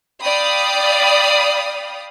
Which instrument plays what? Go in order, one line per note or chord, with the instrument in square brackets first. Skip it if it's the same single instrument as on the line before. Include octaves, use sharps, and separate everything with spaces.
[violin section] D5 F5 G5 B5 D#6